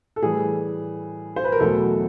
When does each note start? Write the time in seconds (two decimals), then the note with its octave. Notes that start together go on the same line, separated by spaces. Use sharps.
0.16 A4
0.22 A2 E3 G3 G#4
1.36 C5
1.44 B4
1.52 A#4
1.60 E2 B2 F#3 A3 A4